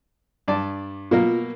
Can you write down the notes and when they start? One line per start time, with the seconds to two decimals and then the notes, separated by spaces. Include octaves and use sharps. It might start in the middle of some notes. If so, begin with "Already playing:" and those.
0.48 G2 D5 A5
1.11 B2 A#3 F4 A#4